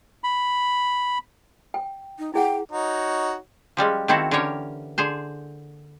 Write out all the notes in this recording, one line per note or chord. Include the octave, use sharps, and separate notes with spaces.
B5
G5
D#4
E4 G#4 F#5 G5
D#4 F#4 C#5
F3 G3 G#3 C#4
D#3 A#3 C4 E4 F#4 A4
D3 E3 C#4 G4 A#4 C#5
D3 G#4 C5